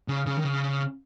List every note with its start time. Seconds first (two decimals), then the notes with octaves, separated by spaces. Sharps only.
0.08 C#3
0.26 C#3
0.37 D#3
0.44 C#3